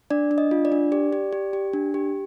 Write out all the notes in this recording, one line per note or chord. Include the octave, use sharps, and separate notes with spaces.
D4 D5
D4
D#5
F4
D5
D4
G4 D5
G4
G4
G4
D4
G4